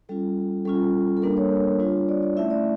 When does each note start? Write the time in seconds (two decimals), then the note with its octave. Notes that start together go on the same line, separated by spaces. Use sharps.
0.09 G3 C#4 F4 A4
0.65 G3 C#4 F4 A4
1.17 A4
1.22 G3 A#3 D4 A#4
1.37 C#5
1.80 G3 D4 F4
2.09 D5
2.22 D5
2.37 A3 C#4 E4 E5
2.50 D5